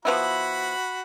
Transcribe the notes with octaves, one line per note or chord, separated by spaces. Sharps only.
F3 B3 E4 F#4 B5